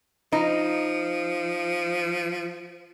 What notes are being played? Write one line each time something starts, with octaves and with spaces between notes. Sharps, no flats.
F3 D#4